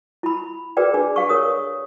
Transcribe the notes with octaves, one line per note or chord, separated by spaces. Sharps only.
E4 B5
F#4 G#4 A#4 B4 D5 G5
D4 G#4
G4 F5 C#6
A#4 C#5 D#6